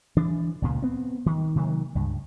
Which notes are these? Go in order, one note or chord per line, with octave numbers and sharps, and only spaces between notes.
E3 D4
C#2 A#2 C#3
B3 C4
D#3
C3 D#3 F#3 A#3
C#2 G2